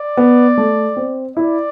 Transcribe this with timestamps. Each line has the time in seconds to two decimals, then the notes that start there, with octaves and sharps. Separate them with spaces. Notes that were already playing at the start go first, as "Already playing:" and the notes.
Already playing: D5
0.17 B3
0.57 A3
0.97 C4
1.36 E4 D5